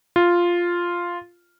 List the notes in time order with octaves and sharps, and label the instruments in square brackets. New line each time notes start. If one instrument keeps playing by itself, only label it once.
[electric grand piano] F4